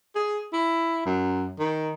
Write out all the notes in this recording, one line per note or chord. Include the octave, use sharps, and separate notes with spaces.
G#4
E4
F#2
D#3